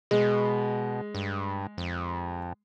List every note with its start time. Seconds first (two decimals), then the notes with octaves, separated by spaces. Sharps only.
0.11 B2 G#3
1.15 G2
1.78 F2